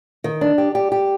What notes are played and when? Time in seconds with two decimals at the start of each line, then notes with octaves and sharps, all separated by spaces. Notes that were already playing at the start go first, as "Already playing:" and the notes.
0.24 D#3
0.41 D4
0.58 G4
0.75 G4
0.92 G4